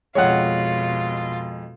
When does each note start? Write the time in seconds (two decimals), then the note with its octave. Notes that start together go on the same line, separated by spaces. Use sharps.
0.15 F2 B2 G#3 F4 C#5 F#5